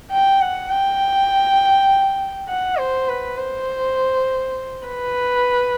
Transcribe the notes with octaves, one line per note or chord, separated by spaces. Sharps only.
G5
F#5
G5
F#5
C5
B4
C5
B4